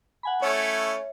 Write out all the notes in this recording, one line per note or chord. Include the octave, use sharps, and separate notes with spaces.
F#5 G#5 B5
A3 C#4 E4 C#5 E5